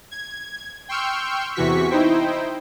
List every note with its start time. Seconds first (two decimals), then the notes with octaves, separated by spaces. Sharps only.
0.11 G#6
0.89 G5 C6 C#6 E6 F6 G6
1.55 E2 C3 E3 F#4 C#6 B6
1.90 D#4 E4 C5 G5